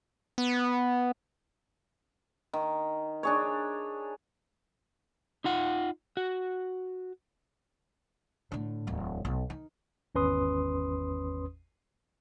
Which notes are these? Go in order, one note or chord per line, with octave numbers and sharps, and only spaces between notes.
B3
D#3
D4 G#4 C#5
D#4 F4 F#5
F#4
A2 D3
D1 E2
B1
D#3
G#1 E2 C#4 B4 C6 D#6